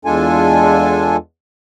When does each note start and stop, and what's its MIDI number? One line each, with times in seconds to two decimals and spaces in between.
0.05 1.16 40
0.05 1.16 56
0.05 1.16 62
0.05 1.16 65
0.05 1.16 69
0.05 1.16 80